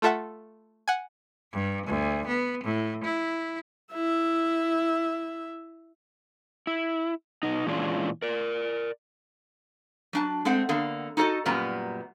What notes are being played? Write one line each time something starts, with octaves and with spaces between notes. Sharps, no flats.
A3 F4 A4 E5 F#5
F#5 G#5
G2
D2
B3
A2
E4
E4 E5
E4
B2 D#4
A#2 E3 G#3 C#4 D4 F4
A#4 D5
F#3 D4 A5
G#3 A3 C4 F#5
D3 A#3 B3
D#4 F#4 A4 D5 D#5
F#2 A#2 G3 B3 A#5